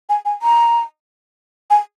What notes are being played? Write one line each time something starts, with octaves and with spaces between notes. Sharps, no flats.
G#5
G#5
A#5
G#5